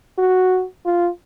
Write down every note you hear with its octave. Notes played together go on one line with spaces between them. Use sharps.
F#4
F4